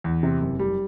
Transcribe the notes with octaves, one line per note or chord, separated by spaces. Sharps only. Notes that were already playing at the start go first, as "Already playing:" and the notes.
E2
C3
F#1
G3